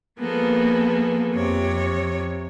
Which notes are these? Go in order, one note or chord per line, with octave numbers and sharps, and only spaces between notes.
F3 A#3 B3 G#4 A4
F2 C3 C#5